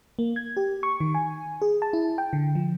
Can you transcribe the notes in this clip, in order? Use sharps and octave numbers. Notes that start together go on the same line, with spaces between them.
A#3
G#6
G4
C#6
D#3
G#5
G#4
A5
E4
G5
D3
F3